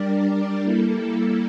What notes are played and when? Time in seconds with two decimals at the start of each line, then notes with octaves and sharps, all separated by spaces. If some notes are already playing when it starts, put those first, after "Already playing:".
Already playing: G3 D4 G4 A#4 D5
0.63 G3 A#3 E4 A4